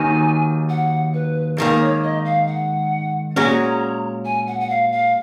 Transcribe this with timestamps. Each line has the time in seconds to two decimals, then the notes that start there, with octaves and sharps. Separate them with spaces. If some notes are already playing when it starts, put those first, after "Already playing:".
Already playing: D#2 D#3 F#3 B3 G#5
0.69 F#5
1.14 B4
1.58 G#2 D#3 A#3 A#4
1.81 C#5
2.03 D#5
2.25 F5
2.47 F#5
3.36 A#2 G#3 C#4 F#4 A#5
4.25 G#5
4.47 F#5
4.60 F#5
4.70 F5
4.92 F5